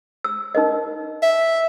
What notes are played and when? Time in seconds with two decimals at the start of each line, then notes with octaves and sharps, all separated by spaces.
0.24 E6
0.55 D#4 A#4 D#5
1.22 E5